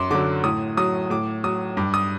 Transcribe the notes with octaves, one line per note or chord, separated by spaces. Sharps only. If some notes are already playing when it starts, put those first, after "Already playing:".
Already playing: F#2 C6 D6
D3 F#3 D6
A2 D#6
F#3 D#6
A2 D6
F#3 D#6
G2 D6
D#6